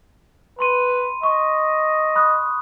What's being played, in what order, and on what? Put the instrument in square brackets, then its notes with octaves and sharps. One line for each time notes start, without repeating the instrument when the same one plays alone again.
[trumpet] B4 [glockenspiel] B5 C6 D#7
[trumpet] D#5 [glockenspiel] C#6
[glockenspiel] B5 D#6 F#6